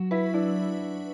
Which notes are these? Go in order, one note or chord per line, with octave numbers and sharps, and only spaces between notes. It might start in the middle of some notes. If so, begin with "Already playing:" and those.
Already playing: F#3 F#4
E4 B4
D4 E4